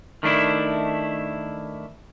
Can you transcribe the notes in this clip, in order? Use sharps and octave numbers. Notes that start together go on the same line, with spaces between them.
D#3 A3 D4 E4